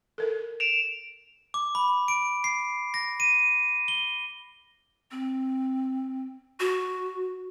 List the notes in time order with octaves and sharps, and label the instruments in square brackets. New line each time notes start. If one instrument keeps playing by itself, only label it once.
[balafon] A4 A#4
[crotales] D7 E7 F7
[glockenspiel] D6
B5
D7
C7
A#6
D#7
G7
[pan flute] C4
F#4